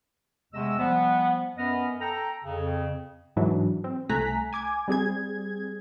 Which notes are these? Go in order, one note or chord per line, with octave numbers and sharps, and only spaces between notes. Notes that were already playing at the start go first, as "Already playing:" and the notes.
E2 C3 G#3 A3 D#5 E6
F3 G3 B3
F#2 B3 D#5 F6
A4 G5 A#5
F2 C#3
G#2 E3 F#3 D4
C4
C2 A3 G#5 A#5 F#6 B6
G#5 D6 G#6
G3 C4 G#4 G#6